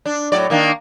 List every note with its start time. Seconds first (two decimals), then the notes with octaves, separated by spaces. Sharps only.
0.06 D4
0.32 A2 F#3 D5
0.50 D#3 A#3 D4